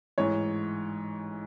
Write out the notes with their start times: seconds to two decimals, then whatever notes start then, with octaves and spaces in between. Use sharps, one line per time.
0.18 A1 G#2 E3 C#5